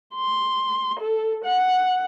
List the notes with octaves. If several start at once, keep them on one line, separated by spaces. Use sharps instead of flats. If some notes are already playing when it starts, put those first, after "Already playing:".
C6
A4
F#5